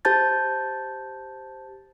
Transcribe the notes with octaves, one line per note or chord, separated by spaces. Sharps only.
G4 C5 A5 G6 A6